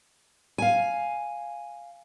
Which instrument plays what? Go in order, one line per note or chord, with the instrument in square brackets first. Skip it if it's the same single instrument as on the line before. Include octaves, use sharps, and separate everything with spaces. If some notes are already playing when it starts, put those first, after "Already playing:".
[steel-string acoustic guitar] F5 G#5